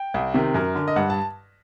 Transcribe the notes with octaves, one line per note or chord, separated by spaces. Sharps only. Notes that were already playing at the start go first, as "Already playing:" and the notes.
Already playing: G5
C2
C3 D#3
F#2 A#4
D3
D#5
G2 F#5
A5